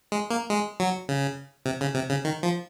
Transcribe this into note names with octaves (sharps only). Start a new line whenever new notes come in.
G#3
A#3
G#3
F#3
C#3
C3
C#3
C3
C#3
D#3
F3